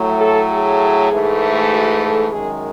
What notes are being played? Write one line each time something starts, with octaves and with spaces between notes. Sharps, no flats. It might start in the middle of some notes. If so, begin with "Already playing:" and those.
Already playing: A2 F#3 A3
A4
G#4
G#2 E3 A3
F#4
A4
F#2 D#3 G#3 G#4